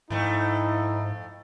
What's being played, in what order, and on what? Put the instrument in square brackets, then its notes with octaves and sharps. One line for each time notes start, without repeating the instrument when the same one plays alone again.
[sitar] F2 A3 [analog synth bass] G#2 [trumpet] D#4 [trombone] E4